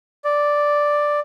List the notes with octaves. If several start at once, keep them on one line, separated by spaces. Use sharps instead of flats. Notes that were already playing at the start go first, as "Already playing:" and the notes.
D5